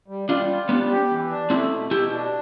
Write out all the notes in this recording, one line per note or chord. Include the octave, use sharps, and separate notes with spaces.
G3
G3 D4 F4
F4
G3 B3 D4
G4
E3
D4
A3 C4 E4
B2
B2 E4 G4
D4